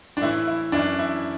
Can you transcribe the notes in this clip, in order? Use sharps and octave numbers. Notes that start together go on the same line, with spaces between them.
D4
A2 E3 E4
E4
F#2 E3 D4
E4